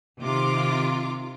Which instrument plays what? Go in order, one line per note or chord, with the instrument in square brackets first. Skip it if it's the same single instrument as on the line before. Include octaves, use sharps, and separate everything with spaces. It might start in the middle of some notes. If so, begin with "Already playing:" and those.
[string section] C3 D#3 F4 D6